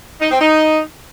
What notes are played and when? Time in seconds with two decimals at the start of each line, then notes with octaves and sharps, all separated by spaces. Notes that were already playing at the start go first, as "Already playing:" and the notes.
0.21 D#4
0.31 C4
0.41 D#4